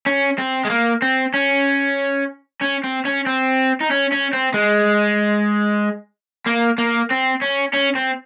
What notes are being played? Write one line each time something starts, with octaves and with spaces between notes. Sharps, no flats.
C#4
C4
G#3
A#3
C4
C#4
C#4
C4
C#4
C4
D#4
C#4
C#4
C4
G#3
A#3
A#3
C4
C#4
C#4
C4